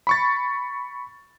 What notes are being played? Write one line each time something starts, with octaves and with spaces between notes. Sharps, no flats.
B5 C#6 A6